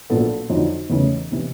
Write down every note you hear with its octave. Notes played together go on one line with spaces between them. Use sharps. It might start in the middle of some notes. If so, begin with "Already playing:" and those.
A#1 A#2 F#3 B3 A4
F2 D3 F#3 D#4
E2 C#3 E3 A3
C3 E3